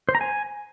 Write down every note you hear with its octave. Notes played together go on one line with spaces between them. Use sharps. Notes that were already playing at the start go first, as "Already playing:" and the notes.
C5
A#5
G#5